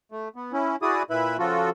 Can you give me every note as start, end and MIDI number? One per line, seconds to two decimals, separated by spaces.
0.12 0.29 57
0.36 0.52 59
0.53 0.76 61
0.53 0.76 64
0.82 1.03 64
0.82 1.03 66
0.82 1.03 68
0.82 1.03 74
0.82 1.03 87
1.10 1.37 46
1.10 1.37 64
1.10 1.37 71
1.10 1.37 76
1.10 1.37 83
1.39 1.70 49
1.39 1.70 53
1.39 1.70 65
1.39 1.70 66
1.39 1.70 69